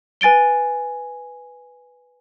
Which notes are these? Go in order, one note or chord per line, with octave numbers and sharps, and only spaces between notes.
B4 G#5 A6 D7 G7